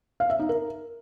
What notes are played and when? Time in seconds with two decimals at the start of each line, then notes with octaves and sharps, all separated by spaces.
0.20 F5
0.30 E5
0.39 D#4
0.49 A#4